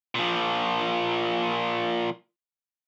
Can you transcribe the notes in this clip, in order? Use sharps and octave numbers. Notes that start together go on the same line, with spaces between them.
A#2 F3